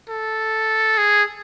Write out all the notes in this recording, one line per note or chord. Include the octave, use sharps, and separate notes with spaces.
A4
G#4